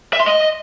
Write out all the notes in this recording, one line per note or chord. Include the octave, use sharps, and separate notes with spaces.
E5
C6
D#5